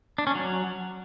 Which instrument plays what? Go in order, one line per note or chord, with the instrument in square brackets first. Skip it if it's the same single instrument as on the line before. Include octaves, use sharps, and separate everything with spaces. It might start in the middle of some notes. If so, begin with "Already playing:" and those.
[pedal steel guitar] D4
C#4
F#3